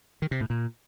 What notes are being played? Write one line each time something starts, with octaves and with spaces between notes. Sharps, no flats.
D#3
C3
A2
A#2